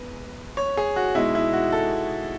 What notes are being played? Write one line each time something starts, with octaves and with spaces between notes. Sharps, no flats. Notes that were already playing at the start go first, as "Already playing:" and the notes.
Already playing: E2 G#3 B4
C#5
G#4
F#4
B2 G#3 D#4 E4
E4
F#4
A4